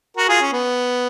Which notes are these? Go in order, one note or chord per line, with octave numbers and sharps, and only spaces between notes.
F#4 A#4
F4 G#4
C#4
B3